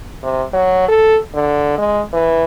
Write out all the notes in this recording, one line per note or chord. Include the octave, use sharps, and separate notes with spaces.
C3
F#3
A4
D3
G#3
E3